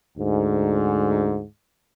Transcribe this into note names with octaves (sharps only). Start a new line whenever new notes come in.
D2 G#2